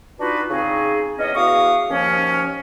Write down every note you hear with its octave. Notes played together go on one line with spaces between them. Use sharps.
D4 D#4 F4 F#4 B4
C#3 C4 D#4 G#4
E2 C#4 C#5 D#5
E2 F#4 F5 C#6 D#6
D#2 F3 A#3 C#4